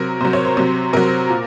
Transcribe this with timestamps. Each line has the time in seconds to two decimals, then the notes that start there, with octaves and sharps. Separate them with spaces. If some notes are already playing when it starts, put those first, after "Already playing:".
Already playing: C3 F#3 A#4
0.21 C3 F#3 C5
0.33 C#5
0.45 C5
0.57 C3 F#3
0.93 C3 F#3 A#4
1.30 A#2